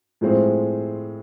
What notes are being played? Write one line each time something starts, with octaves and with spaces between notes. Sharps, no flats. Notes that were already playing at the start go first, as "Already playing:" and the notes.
A2 F3 G#3 C4